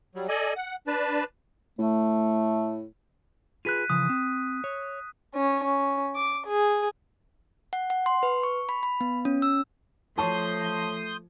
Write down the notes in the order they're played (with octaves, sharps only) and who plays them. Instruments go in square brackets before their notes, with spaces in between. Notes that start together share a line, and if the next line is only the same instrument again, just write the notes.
[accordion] F#3 G3
A4 D5 D#5 G#5
F#5
D4 B4 A5
[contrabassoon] A2 [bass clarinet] A3
[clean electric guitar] F4 G#4 B4 [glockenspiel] F#6 B6 D#7
[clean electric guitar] C#3 E3 F3 [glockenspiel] D#6
[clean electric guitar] C4
C#5
[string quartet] C#4
C#4
D6
G#4
[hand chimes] F#5
F#5
C6
B4
C#6
B5
B5
B3
C#4
E6
[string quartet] F3 [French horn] A3 [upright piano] C#5 A5 C#6 [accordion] C6 D#6 G6